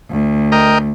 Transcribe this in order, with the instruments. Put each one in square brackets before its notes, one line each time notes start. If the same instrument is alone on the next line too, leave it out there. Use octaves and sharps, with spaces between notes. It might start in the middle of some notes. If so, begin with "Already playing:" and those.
[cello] D2
[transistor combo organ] A#4 D#5 G5